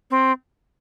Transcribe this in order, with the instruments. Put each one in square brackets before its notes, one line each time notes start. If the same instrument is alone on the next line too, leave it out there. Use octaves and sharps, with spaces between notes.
[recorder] C4